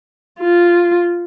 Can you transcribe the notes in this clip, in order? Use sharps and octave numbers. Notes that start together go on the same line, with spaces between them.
F4